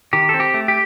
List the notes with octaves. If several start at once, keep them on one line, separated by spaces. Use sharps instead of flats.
D#3 G4
C4 A4
G4
A3
G4